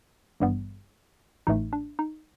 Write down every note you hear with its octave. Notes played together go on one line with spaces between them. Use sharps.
G#1 G2 E3 G3 B3
A1 A2 E3 A3 D#4
D4
D#4